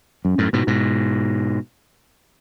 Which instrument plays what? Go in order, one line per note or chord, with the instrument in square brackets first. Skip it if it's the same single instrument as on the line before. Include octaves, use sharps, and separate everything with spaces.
[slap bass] F#2
F#2 A2
G#2 B2
G#2 B2